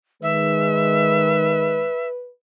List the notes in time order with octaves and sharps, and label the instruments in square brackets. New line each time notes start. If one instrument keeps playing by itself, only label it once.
[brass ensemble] D#3 G#3 [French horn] B4 [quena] E5